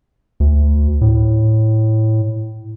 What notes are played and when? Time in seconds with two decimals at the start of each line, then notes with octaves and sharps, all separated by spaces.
0.40 D2
1.01 A2